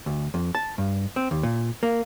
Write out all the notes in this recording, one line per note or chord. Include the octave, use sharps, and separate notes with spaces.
D2
F2
A5
G2
C4
D#2
A#2
A#3